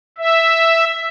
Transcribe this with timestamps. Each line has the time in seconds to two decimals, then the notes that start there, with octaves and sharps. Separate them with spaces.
0.18 E5